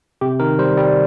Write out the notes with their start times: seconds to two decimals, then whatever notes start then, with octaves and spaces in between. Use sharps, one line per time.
0.21 C3 G4
0.40 D#3 A#4
0.59 G3 C5
0.77 G3 D5